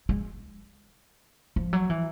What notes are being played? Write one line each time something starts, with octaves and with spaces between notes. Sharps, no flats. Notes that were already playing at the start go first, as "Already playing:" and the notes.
G#3
F3
F#3
E3